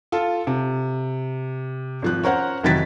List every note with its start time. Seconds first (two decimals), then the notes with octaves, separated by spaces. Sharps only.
0.12 F4 A4 F5
0.47 C3
2.02 G#1 F3 F#6
2.23 C#4 A#4 C5 F#5
2.63 F1 D#3 E3 F#3 A6 B6